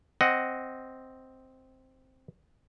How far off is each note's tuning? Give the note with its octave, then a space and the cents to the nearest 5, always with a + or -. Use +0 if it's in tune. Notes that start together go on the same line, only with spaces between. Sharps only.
C4 +0 D#5 +0 F#5 +5